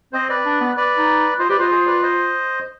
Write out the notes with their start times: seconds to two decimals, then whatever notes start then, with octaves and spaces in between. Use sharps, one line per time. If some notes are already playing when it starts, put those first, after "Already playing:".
0.13 C4 C5 D#5
0.29 B4 D5
0.45 D4
0.61 B3
0.77 B4 D5
0.98 D#4
1.39 F4 C5 D#5
1.49 G4 B4 D5
1.58 F4 C5 D#5
1.71 G#4 C5
1.87 B4 D5
2.02 C5 D#5